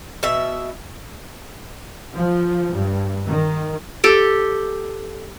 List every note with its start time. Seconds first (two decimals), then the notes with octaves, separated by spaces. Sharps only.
0.23 B2 E5
2.12 F3
2.73 G2
3.28 D#3
4.04 G4 A4 G5